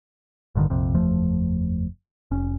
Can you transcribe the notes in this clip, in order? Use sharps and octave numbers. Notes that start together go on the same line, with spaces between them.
A1 G2 D3 D#3
A#1 F2 C3
F#1 E2 F3 A3
F1 C#4